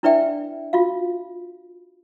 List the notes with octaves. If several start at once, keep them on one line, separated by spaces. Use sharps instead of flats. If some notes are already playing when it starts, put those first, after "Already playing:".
D4 E4 B4 D5 E5 G5
F4 F#4 F5